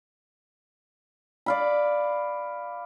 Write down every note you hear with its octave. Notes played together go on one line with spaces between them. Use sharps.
D5 F5 B5